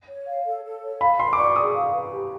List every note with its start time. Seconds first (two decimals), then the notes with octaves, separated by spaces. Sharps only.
0.09 C#5
0.27 F5
0.45 A4
0.64 A4
0.83 C#5
1.01 F5 B5
1.19 B4 C6
1.33 D6
1.37 D5 C#6
1.56 G#4 D#6
1.74 F5
1.93 B4
2.12 G4